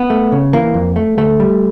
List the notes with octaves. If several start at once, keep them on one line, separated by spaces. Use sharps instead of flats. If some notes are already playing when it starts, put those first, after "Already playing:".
Already playing: B3
A3
C#3
E3 A#3
F2
A3
D2 A3
G3